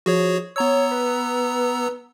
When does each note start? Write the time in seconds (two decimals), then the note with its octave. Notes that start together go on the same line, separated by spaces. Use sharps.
0.06 F3 F#4 G#4 C#5
0.56 B3 C#5 A#5 E6
0.91 B4